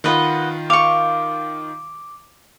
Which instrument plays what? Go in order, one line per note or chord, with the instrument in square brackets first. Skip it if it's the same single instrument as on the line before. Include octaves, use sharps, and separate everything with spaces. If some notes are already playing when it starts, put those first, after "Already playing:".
[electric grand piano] D#3 F4 [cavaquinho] B4 D#5 F#5
[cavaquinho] F5 C#6 [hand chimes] D6